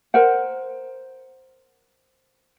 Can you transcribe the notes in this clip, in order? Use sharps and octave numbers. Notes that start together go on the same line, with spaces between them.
A#4 C5 F#5